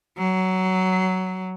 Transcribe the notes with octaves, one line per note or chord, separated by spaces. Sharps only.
F#3